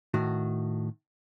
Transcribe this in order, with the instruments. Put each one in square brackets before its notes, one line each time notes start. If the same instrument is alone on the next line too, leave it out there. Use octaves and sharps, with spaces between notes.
[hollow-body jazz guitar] A2 D#3 F#4